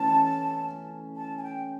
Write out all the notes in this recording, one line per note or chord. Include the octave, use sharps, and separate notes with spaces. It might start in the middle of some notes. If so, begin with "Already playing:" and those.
Already playing: E3 A3 C#4 A5
A5
G#5
G5